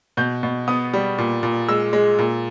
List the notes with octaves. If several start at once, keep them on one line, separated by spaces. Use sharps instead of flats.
B2 G6
B2
B3 D#6
G3
A#2
A#2
G#3 E6
G#3
A#2